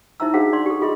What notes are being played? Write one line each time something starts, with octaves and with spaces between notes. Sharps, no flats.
D#4 E4 C5 E5 A#5 E6
D4 F#4 G#4 C5 F5 F#5
D4 D5 C6
G4 A4
F4 G#4 D#5 C6